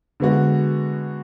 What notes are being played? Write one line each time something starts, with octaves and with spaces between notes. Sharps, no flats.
D3 G#3 B3 F#4